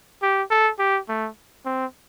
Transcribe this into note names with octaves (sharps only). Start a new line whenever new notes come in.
G4
A4
G4
A3
C4